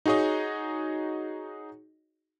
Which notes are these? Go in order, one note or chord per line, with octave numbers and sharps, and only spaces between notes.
D#4 F#4 G#4 C#5 D#5